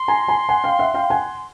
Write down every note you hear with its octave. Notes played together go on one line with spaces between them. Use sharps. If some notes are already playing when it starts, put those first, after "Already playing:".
Already playing: C6
G#5 A#5
G#5 A#5
F#5 G#5
F5 G5
E5 F#5
F5 G5
F#5 G#5